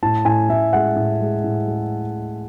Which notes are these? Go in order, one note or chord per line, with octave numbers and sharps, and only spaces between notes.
A2 A5
A2 G#5
A2 E5
G#3 F#5
A2
G#3
A2
G#3